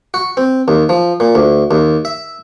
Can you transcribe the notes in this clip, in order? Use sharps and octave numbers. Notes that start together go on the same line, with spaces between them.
F#4
C4
D#2
F3
A#2
D2
D#2
E5